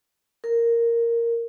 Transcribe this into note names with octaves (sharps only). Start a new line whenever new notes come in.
A#4